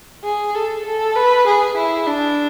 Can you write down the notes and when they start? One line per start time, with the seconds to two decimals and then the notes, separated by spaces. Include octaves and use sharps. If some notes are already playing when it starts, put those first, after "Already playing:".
0.24 G#4
0.54 A4
0.85 A4
1.16 B4
1.47 G#4
1.77 E4
2.07 D4